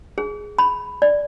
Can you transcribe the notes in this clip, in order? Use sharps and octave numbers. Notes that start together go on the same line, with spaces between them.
G#4
B5
D5